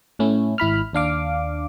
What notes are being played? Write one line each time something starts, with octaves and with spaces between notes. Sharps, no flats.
A2 A3 C#4 E4
G#1 E4 B5 F6
D#2 D4 F5 D6